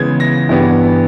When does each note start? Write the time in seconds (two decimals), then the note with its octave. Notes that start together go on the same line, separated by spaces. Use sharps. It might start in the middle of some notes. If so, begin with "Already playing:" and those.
Already playing: C#3 E3 G#3 B3 G#6
0.20 A#6
0.49 G2 E3 G3 B3